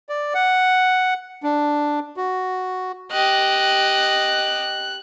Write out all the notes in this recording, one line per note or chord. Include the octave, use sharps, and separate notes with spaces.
D5
F#5
D4
F#4
G4 D#5 F#6